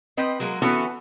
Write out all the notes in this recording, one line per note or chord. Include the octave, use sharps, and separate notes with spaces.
C4 B4 D#5 G5
F#3 G#3 A#3 A#4
E3 B3 C#4 E4 F#4 A4